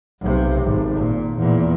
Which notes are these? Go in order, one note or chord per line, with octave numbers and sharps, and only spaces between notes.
B1 C3
G#1
A#2
E2 A#2